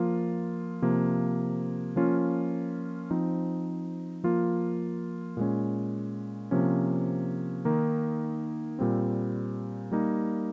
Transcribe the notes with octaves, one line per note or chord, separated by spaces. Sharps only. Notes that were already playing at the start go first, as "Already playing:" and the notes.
Already playing: F3 A#3 F4
C3 F3 A#3
F3 A#3 C#4 F4
F3 C4 D#4
F3 A#3 F4
A#2 G#3 C#4
C3 F3 A#3 C#4
D#3 A#3 D#4
A#2 G3 C4
G3 A#3 D#4